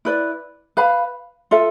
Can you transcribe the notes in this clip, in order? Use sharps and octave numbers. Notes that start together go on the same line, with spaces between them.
E4 B4 D5
B4 F5 B5
F4 A4 E5